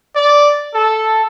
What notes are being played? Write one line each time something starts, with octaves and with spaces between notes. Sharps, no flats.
D5
A4